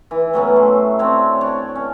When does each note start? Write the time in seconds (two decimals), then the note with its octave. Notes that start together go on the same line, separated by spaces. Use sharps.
0.11 E3
0.33 A2 F#3 B3 C#4
0.56 A3 C6
0.99 C4 D4 C#5
1.41 D4 C#5
1.75 C#4